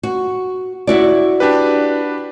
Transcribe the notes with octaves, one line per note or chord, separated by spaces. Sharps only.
F#4
E4 F#4 D5
D4 G4 B4